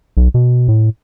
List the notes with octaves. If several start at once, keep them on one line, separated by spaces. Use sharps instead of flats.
B1
B2
A2